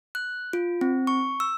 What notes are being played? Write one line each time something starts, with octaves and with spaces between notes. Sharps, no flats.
F#6
F4
C4
C#6
E6